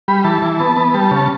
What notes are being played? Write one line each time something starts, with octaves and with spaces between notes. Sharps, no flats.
G3 B5
E3 A5
E3
B3 A5
B3
G3 A5
C#3
A5